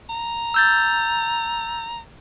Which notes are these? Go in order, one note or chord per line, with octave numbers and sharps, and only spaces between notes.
A#5
E6 G6 A6